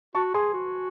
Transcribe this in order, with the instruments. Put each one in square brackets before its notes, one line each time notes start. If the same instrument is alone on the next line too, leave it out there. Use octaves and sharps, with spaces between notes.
[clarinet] F#4 [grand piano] A5 C#6
[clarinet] G#4 [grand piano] G#5 C6
[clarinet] F#4